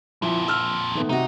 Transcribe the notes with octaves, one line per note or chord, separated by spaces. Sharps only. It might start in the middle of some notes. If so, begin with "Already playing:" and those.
F2 A#2 F3 E4
E6 F6
D#3 A3 B3
C3 D#4 F#4